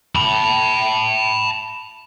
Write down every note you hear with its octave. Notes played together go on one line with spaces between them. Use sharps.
A5 B5